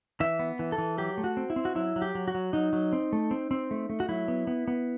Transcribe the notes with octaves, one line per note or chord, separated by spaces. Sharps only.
E3 E5
B3
E3
A4
E3
F#3 G4
A3
F#4
C4
E4
C4
F#4
F#3 E4
F#3
G4
F#3
F#4
F#3
F#3 D#4
F#3
C4
A3
C4
C4
A3
A3
F#4
F#3 E4
B3
B3
B3